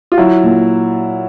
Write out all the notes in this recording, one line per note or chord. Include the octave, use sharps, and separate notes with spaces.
F4
F#3 E4
A#2